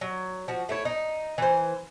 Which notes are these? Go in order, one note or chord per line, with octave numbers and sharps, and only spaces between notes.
F#3
F3 F#4
A3 E4 C#5
D#4
E3 C5